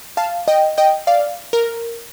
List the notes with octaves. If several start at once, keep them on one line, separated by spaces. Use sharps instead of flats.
F5 A5
D#5 G5
D#5 G5
D5 F5
A#4